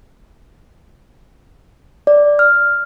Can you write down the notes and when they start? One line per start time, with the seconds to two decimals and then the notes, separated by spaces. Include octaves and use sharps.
2.07 D5
2.39 F6